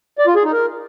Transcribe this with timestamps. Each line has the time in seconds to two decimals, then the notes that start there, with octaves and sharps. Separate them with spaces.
0.18 D5
0.27 F4
0.35 G#4
0.44 D#4
0.52 A#4